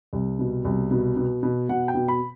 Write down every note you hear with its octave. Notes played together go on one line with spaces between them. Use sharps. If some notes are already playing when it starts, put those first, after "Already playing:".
C2
B2
C2
B2
B2
B2
B2 F#5
G5
B2
B5